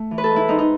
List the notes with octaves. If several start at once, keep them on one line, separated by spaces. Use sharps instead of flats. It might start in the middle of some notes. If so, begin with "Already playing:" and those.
Already playing: A3
E3
B4
A4
G#2
E4
G#2 D#4
D#4